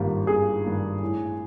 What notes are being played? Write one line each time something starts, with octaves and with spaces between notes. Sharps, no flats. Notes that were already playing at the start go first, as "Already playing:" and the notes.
Already playing: G#1 G2 D#3 G3 A#3 F4
G#1 G#4
G2 D#3 G3 A#3
A2